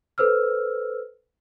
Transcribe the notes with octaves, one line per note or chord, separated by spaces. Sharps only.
A4 B4 C5 E6 F6